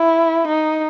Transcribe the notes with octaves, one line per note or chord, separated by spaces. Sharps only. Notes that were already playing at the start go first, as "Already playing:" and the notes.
Already playing: E4
D#4